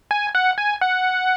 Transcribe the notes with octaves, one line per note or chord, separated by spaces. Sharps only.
G#5
F#5
G#5
F#5